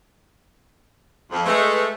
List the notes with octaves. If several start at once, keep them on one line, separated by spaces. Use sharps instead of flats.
F2
G#3 A3 B4